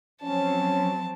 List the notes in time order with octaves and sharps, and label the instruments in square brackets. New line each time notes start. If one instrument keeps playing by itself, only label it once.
[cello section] F3 F#3 C4 [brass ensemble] C#4 [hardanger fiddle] A5